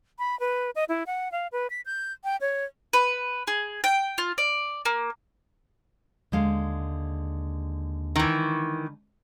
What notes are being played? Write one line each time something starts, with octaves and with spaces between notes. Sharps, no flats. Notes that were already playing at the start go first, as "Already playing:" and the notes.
B5
B4
D#5
E4
F#5
F5
B4
B6
G6
G5
C#5
B4
G#4
G5
F4
D5
A#3
D#2 D3 G#3 F5
D#3 E3